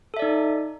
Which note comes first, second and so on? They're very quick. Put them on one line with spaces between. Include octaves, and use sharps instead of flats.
A4 E5 D5 D#4